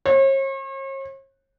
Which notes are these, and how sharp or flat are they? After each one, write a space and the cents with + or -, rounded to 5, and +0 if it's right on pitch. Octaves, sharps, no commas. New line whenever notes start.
C#5 -45